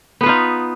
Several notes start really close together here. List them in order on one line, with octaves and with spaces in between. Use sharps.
B3 B4 F4 D#4